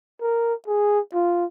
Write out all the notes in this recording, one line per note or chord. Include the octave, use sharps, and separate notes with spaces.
A#4
G#4
F4